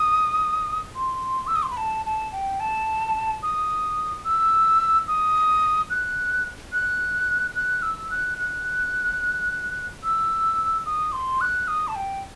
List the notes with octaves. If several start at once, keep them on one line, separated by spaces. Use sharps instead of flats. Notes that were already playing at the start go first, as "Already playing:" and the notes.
Already playing: D#6
C6
E6
D#6
C6
B5
A5
A5
G5
A5
D#6
E6
D#6
F#6
F#6
F#6
E6
F#6
F#6
E6
D#6
C6
F#6
D#6
A5
G5